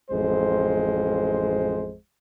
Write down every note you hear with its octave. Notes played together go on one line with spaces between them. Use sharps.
A1 F2 G#3 C5